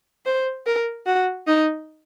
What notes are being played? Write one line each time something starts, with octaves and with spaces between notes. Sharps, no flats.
C5
A#4
F#4
D#4